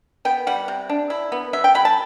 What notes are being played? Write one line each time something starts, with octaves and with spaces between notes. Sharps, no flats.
B3 G5
G3 F#5
C3
D4
E4
B3
F#3 E5
G5
F#3 B5
A5